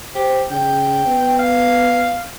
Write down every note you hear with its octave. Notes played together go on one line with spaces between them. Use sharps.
G4 C5
C#3 G5
B3
F5